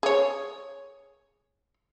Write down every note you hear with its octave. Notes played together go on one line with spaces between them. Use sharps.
G#4 C#5